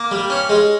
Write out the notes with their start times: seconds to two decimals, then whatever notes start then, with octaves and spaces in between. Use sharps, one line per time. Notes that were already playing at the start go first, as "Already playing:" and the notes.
Already playing: A#3
0.11 G3
0.30 C#4
0.49 G#3